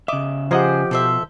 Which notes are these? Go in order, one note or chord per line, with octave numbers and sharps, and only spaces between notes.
C#3 D#5 E5 D6
F3 G4 G#4 C5 D#5 F#5 A#5
B2 A4 C5 E5